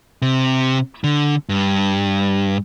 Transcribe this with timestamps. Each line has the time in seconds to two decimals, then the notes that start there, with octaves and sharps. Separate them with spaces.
0.22 C3
1.04 D3
1.49 G2